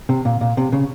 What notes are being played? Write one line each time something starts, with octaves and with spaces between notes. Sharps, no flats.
C3
A#2
A#2
C3
C#3